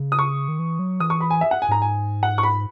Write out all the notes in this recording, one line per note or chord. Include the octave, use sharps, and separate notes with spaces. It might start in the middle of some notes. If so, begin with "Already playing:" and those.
Already playing: C#3
D#6
C#6
D#3
E3
F#3
E3 D#6
C#6
B5
G#5
E5
F#5
G#5
G#2 A#5
G#5
F#5
C#6
B5